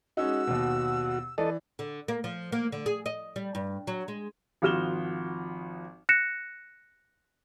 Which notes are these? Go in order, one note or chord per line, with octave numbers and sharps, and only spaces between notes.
G#3 C#4 D#4 F#4 E6
D#2 B2
E3 A4 D5 D#5
D3
A#3
F3
A#3
D3
G#4
D#5
G3
G2
F#3
G#3
G#1 F3 F#4 F6 E7 G7
F#6 A#6 C#7 E7